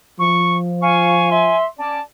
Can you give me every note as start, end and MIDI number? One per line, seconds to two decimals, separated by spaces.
0.19 1.63 53
0.19 0.57 85
0.82 1.28 77
0.82 1.57 80
0.82 1.28 85
1.31 1.64 76
1.31 1.64 84
1.79 2.00 61
1.79 2.00 74
1.79 2.01 81